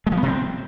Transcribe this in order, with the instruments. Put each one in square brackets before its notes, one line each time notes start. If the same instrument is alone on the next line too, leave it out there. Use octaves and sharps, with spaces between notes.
[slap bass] G#3
F3
B3
C3
C4